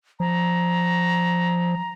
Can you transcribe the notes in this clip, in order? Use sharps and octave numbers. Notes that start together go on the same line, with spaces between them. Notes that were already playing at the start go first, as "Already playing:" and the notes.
F3 A#5